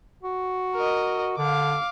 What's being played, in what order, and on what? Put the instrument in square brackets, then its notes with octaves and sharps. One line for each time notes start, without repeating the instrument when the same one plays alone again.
[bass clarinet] F#4
[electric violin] A#4 D#5
[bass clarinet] D3 [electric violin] F5 D6